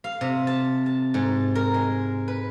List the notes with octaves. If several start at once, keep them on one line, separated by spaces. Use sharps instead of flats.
F5
C3
A5
A5
G#2
A#4
G#3
B4